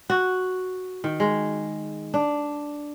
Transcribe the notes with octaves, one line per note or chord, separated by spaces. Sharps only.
F#4
D#3
G#3
D4